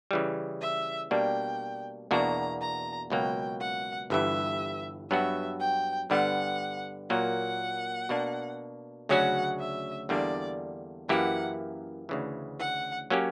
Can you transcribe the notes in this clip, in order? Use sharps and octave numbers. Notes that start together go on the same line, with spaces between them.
C#3 E3 G3
E5
B2 G3 A#3 D4 G5
E2 B2 A#3 D4 F#4 A#5
A#5
C#2 B2 F#3 A#3 G5
F#5
G1 G2 E3 E5
G2 F#3 B3 F#4 E5
G5
G2 D3 G3 B3 F#5
A#2 F#3 A#3 F#5
B2 A#3 D4
D2 C#3 F#3 C#4 F#4 F#5
E5
E2 D3 G3 A#3 D4 D5
F#2 E3 A#3 E4 G4 F#5
D2 C#3 E3
F#5
F#3 A#3 C#4 G4